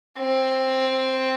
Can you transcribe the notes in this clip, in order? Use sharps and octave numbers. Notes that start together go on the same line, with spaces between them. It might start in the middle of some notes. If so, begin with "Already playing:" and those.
C4